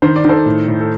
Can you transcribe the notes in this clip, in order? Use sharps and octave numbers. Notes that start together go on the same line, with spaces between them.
D#3 C5
D5
D#3 A4 C5
A2
A2
A4